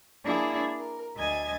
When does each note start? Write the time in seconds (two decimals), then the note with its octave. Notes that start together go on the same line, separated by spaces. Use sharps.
0.24 A#3 D4 E4 G#4 C#5
0.78 A#4
1.16 D2 D#5 E5 G#5 G#6 A6